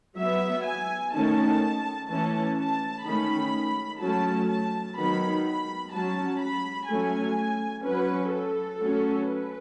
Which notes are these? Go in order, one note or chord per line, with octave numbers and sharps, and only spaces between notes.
F#3 B3 E5
G#5
D#3 A3 C#4 A5
E3 A3 C#4 A5
A5
D#3 A3 C#4 B5
F#3 A3 C#4 A5
A5
D#3 F#3 B3 B5
B5
F#3 C#4 A5
B5
F#3 A3 C#4 G#5
F#3 C#4 B4
A4
F#3 A3 C#4
B4